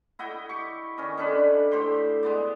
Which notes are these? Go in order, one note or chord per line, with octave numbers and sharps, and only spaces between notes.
E4 D#5 F#5 G5
G4 C#6
D#3 C#4 D#5
D3 C#4 D4 B4
A2 G4 C5 G5
G#3 B3 D5